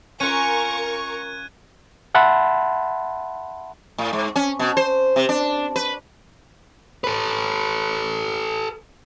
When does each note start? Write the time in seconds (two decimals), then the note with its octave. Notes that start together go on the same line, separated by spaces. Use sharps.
0.20 C#4 F4 A#4 C#6 F#6 G#6 D#7
2.15 E5 F#5 A5 B5 C6
3.98 A2
4.13 G#2
4.36 C#4
4.59 B2
4.77 C5
5.16 C3
5.29 D4
5.76 B4
7.04 A4 B4